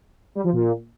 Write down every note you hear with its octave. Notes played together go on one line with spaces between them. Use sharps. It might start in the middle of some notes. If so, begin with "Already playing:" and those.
G3
F3
A#2